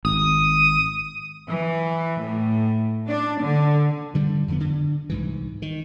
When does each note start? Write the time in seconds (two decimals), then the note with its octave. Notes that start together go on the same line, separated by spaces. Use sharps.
0.05 G#1 D#6
1.48 E3
2.21 A2
3.07 D4
3.41 D3
4.14 G2 D3 G3
4.48 F2 D3 B3
4.60 D3
5.10 C2 G#2 E3
5.62 D#3